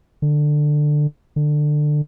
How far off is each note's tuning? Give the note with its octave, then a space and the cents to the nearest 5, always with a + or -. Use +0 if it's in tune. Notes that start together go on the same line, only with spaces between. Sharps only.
D3 +15
D3 +20